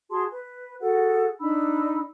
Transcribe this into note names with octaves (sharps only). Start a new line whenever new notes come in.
F#4 G#4 A5 C6
B4
F#4 G#4 A4 F#5
D4 D#4 B5 E6